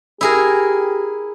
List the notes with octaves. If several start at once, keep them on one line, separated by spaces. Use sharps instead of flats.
E4 G4 G#4 A#4